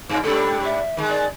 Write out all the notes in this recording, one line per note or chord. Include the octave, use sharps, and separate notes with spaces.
G2
G#2 G3 D4 A4
E5
D#3 G#3
D5